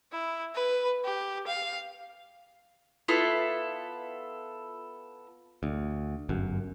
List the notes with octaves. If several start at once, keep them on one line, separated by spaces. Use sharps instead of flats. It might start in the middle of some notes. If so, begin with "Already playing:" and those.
E4
B4
G4
F5
B3 E4 F4 A4
D2
G1 F#2